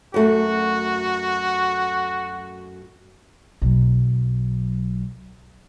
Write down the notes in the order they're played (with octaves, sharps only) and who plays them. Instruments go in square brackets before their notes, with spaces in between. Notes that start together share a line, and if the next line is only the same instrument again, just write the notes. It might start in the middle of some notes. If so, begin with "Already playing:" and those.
[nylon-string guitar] F#2 A3 [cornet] F#4
[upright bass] B1 F#3